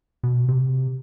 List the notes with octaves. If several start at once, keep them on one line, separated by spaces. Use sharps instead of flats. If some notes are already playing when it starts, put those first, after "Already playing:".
B2
C3